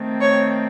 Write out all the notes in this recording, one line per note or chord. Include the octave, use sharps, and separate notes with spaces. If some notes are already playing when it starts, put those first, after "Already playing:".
Already playing: D#3 A3 C4
C#5